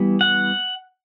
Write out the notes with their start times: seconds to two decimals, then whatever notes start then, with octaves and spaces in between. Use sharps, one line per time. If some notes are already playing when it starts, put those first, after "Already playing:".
Already playing: E3 G3 B3
0.21 F#5